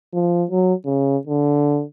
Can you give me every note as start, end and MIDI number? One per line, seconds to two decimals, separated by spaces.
0.14 0.44 53
0.51 0.74 54
0.85 1.17 49
1.27 1.83 50